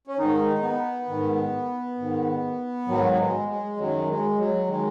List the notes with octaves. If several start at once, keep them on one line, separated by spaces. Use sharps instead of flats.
C#4
G#2 D#3 D#4
B3
G#2 D#3
G#2 D#3
G#2 D#3 F#3
B3
G#3
G#3
F#2 D#3 F#3
G#3
F#3
D#3 G#3